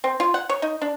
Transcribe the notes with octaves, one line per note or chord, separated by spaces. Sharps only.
C4
F4
F#5
C#5
D#4
D4